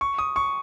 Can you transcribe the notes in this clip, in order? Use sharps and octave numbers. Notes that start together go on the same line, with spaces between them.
C#6
D#6
C#6